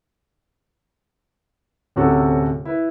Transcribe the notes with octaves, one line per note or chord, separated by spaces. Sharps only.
D1 C3 C#4 F#4 A4
E4 B4